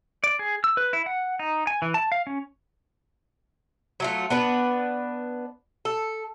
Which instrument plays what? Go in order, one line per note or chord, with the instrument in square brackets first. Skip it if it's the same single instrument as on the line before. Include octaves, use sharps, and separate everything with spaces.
[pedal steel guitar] D5
G#4
E6
B4
E4
F#5
D#4
G#5
E3
A5
F5
C#4
[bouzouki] F#3 A3 F4
B3 D4 B4
A4